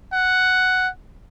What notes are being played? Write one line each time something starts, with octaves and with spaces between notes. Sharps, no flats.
F#5